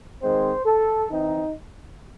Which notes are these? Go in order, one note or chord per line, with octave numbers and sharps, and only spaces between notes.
D#3 G#3 C4 C5
A4
E3 C4 D#4